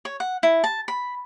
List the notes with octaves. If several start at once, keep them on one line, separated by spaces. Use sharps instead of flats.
C#5
F#5
E4
A5
B5